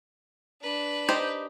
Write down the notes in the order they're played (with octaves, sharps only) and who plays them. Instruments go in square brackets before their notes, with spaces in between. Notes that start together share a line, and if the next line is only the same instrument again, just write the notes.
[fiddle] D4 B4
[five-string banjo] D#4 G4 C5